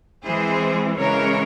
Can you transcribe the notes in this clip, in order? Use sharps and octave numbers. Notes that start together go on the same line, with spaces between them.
E3 G#3 C4 G#4 C5
C#3 E3 G#3 A#4 C#5